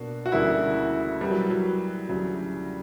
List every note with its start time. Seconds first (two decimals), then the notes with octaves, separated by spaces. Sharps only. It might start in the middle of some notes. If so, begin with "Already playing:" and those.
Already playing: B2 A#3 D4 F#4
0.26 F#4
0.32 D2 C#3 E3 G3 A#3 E4
1.21 E3 G3 B3 F#4 A#4
1.30 F#3
1.50 F#3
2.09 D2 C#3 E3 F#3